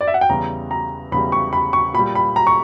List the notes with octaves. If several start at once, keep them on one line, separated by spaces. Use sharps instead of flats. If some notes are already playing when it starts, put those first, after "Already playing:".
D5
E5
F#5
G5
E2 C#3 G3 A#5
A#5
E2 C#3 G3 B5
C#6
B5
C#6
A#2 B5
G3
B5
A#5
C#6